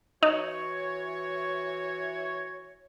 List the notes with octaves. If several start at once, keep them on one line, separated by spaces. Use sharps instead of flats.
E3 D#4 F#4 C#5